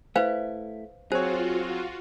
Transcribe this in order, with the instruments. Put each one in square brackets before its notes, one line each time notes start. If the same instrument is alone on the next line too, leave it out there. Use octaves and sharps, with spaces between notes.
[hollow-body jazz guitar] A3 E4 [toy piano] B4 C5 F5
[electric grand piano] F#3 C4 C#5 [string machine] F4 F#4 [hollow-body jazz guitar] G#4 [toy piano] C5